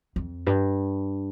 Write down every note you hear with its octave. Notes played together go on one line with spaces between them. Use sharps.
F2
G2